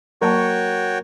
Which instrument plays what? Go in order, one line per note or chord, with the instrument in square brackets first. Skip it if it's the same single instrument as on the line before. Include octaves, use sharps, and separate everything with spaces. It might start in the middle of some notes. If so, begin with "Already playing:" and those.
[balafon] F#3 A#3 A5 [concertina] F#4 C#5 G5 [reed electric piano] A#4